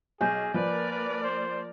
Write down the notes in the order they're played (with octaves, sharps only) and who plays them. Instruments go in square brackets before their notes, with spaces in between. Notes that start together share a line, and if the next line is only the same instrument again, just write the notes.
[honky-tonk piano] B1 [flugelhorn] G#4 [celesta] G#5 G6
[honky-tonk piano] F3 [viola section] A#3 A#4 D5 [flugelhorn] B4
[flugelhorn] B4
C5